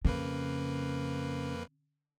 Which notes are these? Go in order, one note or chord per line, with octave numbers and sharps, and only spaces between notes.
F2 C#3 A#3 B4